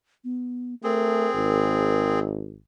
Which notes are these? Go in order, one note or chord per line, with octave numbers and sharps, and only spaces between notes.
B3
A3 C4 G#4 A#4
G#1 A#4